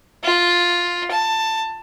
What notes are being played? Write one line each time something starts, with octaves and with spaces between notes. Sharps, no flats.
F4
A5